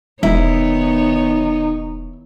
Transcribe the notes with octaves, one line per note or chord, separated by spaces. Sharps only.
E1 D#3 B3 D#4 E4 C#5